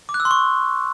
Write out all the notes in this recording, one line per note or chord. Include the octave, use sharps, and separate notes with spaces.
D6
F#6
E6
C6
C#6